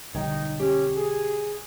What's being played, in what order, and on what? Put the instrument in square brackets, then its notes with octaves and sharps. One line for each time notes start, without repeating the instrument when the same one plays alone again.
[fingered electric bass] B1 D3 G3 [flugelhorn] D#4 [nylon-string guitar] C#5 G5
[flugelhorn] C#4 [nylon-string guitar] G4
[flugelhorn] G#4